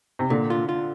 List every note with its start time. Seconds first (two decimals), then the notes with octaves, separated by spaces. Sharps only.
0.19 C3
0.30 A#2 D3
0.50 F4
0.69 F4